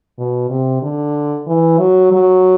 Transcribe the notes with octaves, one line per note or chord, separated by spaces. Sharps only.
B2
C3
D3
E3
F#3
F#3